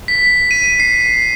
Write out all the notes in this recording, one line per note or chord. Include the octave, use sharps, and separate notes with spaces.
B6
D#7
C7